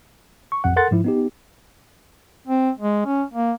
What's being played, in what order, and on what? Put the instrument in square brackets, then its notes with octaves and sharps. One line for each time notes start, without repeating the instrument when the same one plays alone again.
[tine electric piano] C#6
A1 F2 F#5
A4 A#4 F#5 C6 A6
G#2 F3 E4
B3 D#4 G4
[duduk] C4
G#3
C#4
A#3